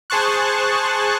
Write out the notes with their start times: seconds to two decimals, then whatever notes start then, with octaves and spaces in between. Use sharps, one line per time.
0.10 G#4 C5 A5 C#6 F#6